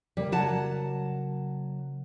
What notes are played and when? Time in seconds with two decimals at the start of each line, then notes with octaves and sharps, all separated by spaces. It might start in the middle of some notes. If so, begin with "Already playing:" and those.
0.17 C#3 G3 A#3
0.32 F#3 F#5 A5